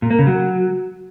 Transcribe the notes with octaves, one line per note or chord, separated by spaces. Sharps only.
A#2
A#3
C#3
F#3